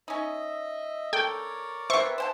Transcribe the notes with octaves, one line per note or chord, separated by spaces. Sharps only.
C#4 D#4 D#5 E5
A4 A#4 C#5 D5 G5
C4 B4 C5 E5 C#6
C5 G5 A5